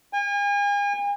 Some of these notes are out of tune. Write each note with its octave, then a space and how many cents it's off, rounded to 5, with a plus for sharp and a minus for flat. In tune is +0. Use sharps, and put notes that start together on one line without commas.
G#5 -40